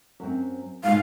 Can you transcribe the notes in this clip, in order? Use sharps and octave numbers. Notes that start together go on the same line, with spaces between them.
F#2 C4
G#2 B2 F5